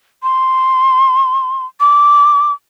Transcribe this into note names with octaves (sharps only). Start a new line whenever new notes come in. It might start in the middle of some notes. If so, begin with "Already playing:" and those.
C6
D6